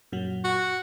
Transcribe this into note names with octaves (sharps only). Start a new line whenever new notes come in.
F#2 A#2 F#3
F#4